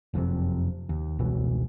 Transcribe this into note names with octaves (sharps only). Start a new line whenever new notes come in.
F#1 F2 G#2 C3
D#2
F1 C#2 B2 E3